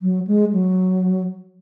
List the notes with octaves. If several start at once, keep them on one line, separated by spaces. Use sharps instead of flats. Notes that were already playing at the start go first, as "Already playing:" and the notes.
F#3
G#3
F#3